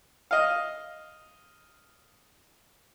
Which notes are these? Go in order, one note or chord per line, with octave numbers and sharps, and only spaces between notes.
D#5 F5